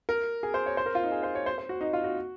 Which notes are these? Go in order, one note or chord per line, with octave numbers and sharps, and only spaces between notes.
A#4
G#4
C5
C#5
C5
A#4
F4
D#4
G#4
C5
C#5
C5
C5
F#4
D#4
F4
F#4